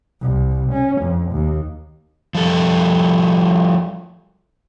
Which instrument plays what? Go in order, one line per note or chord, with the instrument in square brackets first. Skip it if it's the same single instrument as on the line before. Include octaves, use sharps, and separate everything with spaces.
[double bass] C2
C#4
F2
D#2
[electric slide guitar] F3 G3 A4